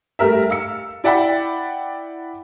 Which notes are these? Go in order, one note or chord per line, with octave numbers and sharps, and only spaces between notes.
G3 A3 G4 A#4 E5
F5 E6 C#7
E4 D5 E5 F#5 G5 B5